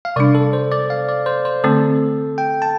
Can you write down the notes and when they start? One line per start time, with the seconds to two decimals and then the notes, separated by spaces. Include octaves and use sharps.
0.05 F5
0.16 C3 G3 D4 D5
0.35 A4
0.53 C5
0.71 D5
0.90 F5
1.09 D5
1.26 C5
1.45 C5
1.64 D3 A3 C4 A4
2.38 G5
2.62 A5